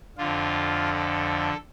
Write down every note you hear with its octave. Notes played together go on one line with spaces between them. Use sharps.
F2 D3 F4
A4